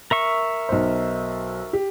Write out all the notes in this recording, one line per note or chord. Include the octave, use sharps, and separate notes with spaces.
A#4 E5 C#6
B1 C5
G4